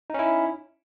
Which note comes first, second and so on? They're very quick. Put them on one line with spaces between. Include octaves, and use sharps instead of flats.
D#4 C#4 E4